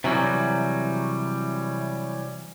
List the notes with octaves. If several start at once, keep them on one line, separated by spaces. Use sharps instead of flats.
C3 E3 F#3 G3